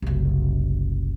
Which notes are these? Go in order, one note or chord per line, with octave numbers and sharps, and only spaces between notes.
F#1 C2